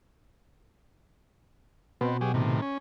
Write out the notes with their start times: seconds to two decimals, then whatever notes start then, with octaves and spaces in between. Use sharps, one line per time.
2.01 B2 B3 C4
2.21 F#3 G4 G#4
2.34 A2 C3 D#3
2.62 C#4